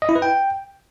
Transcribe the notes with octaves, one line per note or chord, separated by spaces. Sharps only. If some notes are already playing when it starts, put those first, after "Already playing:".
D#5
E4
B4
G5